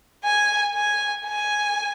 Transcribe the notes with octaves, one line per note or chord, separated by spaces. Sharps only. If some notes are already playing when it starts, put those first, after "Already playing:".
G#5
G#5
G#5